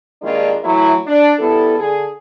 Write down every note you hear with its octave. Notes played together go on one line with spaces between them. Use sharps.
G2 D#3 G#3 A#3 D4 F4
E3 F#3 A3 E4
D4
G3 B3 E4 A4
D3 G#4